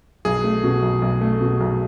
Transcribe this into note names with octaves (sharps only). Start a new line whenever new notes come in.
B1 G#4
A3
B2
B1
B1
A3
B2
B1